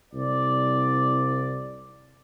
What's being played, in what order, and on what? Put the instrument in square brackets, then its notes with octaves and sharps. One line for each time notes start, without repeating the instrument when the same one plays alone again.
[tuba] C2 [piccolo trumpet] D5